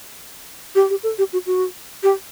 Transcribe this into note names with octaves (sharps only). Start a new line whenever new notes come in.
G4
G4
A4
G4
F#4
F#4
G4